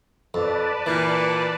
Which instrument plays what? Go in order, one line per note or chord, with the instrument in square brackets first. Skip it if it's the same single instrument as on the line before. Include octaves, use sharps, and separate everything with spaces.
[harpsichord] F2 [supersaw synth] B4 D5 A5
[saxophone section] A#2 [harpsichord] E3